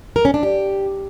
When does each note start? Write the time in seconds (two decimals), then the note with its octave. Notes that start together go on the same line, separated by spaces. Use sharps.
0.16 A#4
0.25 C#4
0.34 D4
0.43 G4